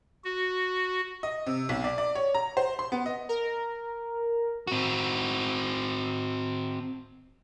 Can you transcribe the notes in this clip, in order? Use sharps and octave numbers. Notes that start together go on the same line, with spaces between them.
F#4
D#5
C3
B1
D5
D5
C#5
A#5
C5
C6
B3
D#5
A#4
C4 F#4